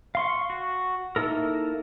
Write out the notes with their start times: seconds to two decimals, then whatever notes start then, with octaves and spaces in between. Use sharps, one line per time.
0.15 F5 C6 C#6
0.50 F#4
1.16 A#3 D#4 E4 A4 A#4